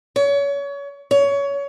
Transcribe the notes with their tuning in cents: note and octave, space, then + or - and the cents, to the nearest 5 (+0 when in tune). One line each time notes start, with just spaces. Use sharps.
C#5 +30
C#5 +20